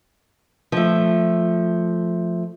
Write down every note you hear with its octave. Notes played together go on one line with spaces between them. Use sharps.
F3 A3